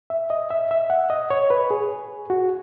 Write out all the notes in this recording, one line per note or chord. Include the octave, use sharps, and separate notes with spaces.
E5
D#5
E5
E5
F#5
D#5
C#5
B4
G#4
F#4